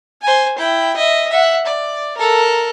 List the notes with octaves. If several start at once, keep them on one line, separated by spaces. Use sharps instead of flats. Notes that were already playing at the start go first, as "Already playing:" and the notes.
C5 G#5
E4 G5
D#5 E5
E5 F#5
D5
A4 A#4